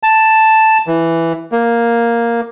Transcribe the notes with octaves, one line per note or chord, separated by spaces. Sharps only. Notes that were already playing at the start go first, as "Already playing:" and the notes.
A5
E3
A#3